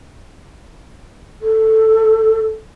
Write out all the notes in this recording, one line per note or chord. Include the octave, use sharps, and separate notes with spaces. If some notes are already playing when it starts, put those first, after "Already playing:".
A4